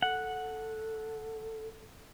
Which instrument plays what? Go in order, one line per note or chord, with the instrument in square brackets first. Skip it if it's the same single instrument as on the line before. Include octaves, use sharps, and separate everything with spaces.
[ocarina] A4 [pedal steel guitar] F#5